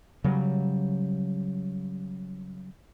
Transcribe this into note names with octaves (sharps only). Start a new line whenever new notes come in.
C#3 F#3 G3